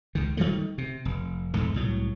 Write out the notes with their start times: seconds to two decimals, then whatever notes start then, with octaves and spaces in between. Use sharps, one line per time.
0.15 C#2 D#3
0.37 D#3 F3 G3 A3
0.78 C3
1.05 F1
1.54 E2 G#2 A3
1.74 C2 A2 F#3